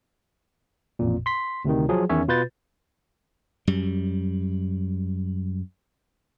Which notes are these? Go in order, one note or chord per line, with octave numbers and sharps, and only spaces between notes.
A1 F2 A#2
C6 B6
D2 C3 D#3
F3 F#3 G#4
E2 D#3 C#4 C#5 E5
B2 F4 B4 G6 A6
F#2 G3